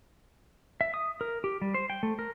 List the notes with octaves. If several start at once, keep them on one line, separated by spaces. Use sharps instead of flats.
E5
D#6
A#4
G4
G3
C5
G5
A3
A#4